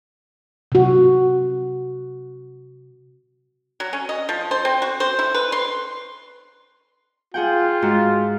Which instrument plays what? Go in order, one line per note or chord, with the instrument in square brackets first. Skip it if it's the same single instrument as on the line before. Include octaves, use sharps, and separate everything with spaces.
[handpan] C3 F#4
[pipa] F#3
C#4
D#5
F3
C5
C4
F#4
C5
E4
B4
C6
[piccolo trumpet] F4 [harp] G#4 F#5 G5
[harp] G#2 F#4